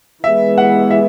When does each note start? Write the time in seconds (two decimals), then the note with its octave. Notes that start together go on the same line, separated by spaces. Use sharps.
0.24 E3 G#3 B3 E5
0.58 F#5
0.91 E5